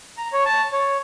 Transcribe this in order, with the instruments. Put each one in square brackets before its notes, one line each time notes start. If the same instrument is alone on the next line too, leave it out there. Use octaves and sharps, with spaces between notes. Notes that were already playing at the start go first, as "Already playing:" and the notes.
[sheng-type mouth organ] A#5
C#5
A5
C#5